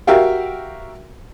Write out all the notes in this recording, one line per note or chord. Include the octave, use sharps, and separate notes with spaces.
F#4 G4 A#4 E5 F5 G5